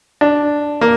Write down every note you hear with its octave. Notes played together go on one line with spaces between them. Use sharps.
D4
A#3